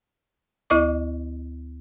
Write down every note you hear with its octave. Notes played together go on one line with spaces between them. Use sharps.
D2 E4 D#5 D6